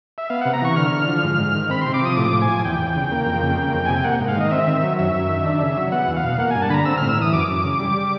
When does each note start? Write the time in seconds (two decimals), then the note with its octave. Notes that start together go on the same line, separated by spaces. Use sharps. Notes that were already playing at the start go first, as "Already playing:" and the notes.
0.18 E5
0.30 B3 F5
0.41 C3 F#5
0.53 A#5
0.62 E3 C#6
0.76 D3 F6
0.92 D3
1.07 F3
1.24 G#2
1.39 G#2
1.55 D#3
1.70 C4 B5
1.82 C3 C6
1.94 D6
2.02 F3 D#6
2.17 A2 D6
2.33 A2
2.41 G#5
2.48 F3
2.65 E2 G5
2.80 E2
2.96 C#3
3.12 A#3
3.26 F2
3.43 C#3
3.57 A#3
3.74 F2
3.86 C3 G#5
3.96 G5
4.04 A#3 F#5
4.20 G#2
4.28 F5
4.36 D#3 D#5
4.51 C4 E5
4.67 D#3
4.83 F#3
4.99 F#2 E5
5.14 F#2
5.29 D#3
5.46 D4
5.61 C#3
5.77 F#3
5.92 B3 F#5
6.07 E2
6.16 F5
6.23 B2
6.38 A#3 F#5
6.51 G2 G#5
6.62 A5
6.70 D3 B5
6.74 A#5
6.85 C4 E6
6.97 A2 F6
7.09 E6
7.18 E3 D#6
7.32 F#2 D6
7.48 F#2
7.64 C#3
7.79 G3